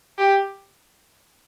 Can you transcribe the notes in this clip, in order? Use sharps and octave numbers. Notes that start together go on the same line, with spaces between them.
G4